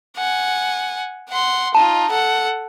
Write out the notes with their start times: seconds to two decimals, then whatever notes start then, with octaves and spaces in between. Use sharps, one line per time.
0.17 F#5 G#5
1.29 F#5 C6
1.75 D#4 F4 A5
2.10 A4 F#5